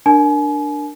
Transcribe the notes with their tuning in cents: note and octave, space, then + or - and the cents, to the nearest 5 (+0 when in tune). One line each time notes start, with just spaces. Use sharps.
D4 +10 A#4 +0 G#5 +35